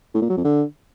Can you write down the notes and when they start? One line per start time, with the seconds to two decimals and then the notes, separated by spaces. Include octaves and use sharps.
0.14 A2
0.22 A#2
0.29 F#3
0.37 F2
0.45 D3